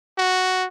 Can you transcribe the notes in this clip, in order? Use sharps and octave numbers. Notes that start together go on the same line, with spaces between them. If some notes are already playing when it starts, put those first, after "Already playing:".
F#4